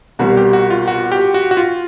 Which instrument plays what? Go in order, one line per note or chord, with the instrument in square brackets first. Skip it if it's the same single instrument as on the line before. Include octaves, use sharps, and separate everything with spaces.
[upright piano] C2 B2 G3 [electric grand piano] F#4
[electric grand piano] G4
F#4
F4
F#4
G4
F#4
F#4
F4